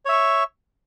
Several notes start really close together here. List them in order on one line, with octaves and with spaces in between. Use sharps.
C#5 E5 C#6